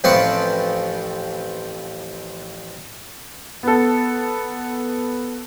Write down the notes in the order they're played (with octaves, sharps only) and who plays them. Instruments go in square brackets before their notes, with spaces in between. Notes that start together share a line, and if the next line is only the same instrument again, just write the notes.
[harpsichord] A1 F3 C4 B4 C5 C#6
[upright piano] B3 A4